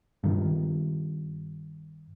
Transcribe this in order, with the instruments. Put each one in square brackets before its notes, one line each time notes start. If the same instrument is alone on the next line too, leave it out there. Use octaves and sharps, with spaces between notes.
[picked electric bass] G2 D#3